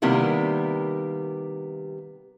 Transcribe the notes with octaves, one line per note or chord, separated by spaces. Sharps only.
C3 D#3 G3 A#3 B3 E4